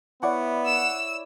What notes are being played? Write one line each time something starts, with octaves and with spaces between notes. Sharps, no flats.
B3 E4 C#5 D5 F#5
E6 E7